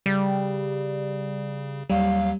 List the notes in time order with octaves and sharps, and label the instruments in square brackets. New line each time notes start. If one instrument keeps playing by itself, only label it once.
[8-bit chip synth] C#3 [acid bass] G3
[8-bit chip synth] D#2 F#3 [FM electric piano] G3 [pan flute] F5